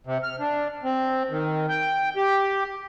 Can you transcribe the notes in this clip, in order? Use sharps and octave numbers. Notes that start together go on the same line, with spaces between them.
C3
F6
D4
C4
D#3
G5
G4